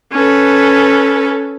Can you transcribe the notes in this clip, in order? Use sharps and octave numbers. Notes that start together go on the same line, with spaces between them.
C#4 A4 B4